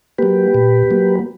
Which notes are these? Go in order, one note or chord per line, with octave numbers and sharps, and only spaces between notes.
F#3 A#3 G4 B4
A#2
F#3 A#3